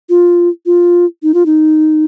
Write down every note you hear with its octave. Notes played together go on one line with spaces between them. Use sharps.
F4
F4
D#4
F4
D#4